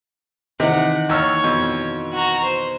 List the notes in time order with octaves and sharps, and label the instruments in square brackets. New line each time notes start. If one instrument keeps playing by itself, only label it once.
[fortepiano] C3 [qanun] D#3 E3 D#4 [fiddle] F#5
[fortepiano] D#2 E6 F6 [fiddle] C#5
[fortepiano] F2 [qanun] B2
[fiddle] F#4 A#5
C5